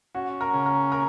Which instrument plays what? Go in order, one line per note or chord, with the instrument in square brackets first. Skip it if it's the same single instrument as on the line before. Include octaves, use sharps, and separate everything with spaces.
[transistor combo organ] C#4 [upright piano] F#4
[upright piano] A#4
[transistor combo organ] C#3
[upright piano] A#4
A#4